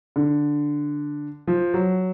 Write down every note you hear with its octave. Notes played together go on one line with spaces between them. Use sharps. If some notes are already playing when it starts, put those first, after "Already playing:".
D3
F3
F#3